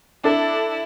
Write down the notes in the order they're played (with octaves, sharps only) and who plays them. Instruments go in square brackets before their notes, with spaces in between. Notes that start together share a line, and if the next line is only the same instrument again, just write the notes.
[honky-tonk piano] D4 A4 [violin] E4